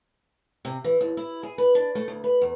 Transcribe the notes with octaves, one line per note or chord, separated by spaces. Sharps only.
C3
E3
D#2
E4
G#4
B4
D4
A3
D2
B4
E2